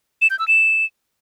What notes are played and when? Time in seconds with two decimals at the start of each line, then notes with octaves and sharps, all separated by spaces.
0.22 E7
0.30 G6
0.39 E6
0.48 E7